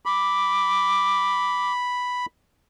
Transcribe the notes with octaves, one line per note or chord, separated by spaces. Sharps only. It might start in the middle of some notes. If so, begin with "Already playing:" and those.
B5 D6